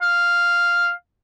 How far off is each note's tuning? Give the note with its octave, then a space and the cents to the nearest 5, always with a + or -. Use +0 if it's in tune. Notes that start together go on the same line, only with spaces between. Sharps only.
F5 -5